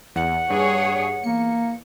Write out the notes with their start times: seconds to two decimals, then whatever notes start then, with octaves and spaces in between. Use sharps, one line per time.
0.16 E2 F#5
0.50 G2 G#4 C#5
1.24 E2 A#3 C#7